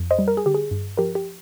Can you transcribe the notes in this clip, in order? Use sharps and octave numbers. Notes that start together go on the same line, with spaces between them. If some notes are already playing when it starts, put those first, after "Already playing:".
Already playing: F2
C5 D#5
G3
A#4
G#4
D3 G4
G#4
G2
F3 G4 A#4
G4